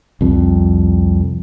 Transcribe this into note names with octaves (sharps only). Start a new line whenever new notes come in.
C2 F2